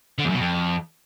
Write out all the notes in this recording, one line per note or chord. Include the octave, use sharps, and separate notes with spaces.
D3
E2
F#2
B2
F2